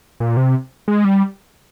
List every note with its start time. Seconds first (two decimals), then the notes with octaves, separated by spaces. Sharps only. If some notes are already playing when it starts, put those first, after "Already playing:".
0.20 A#2
0.37 C3
0.88 G#3
1.05 G3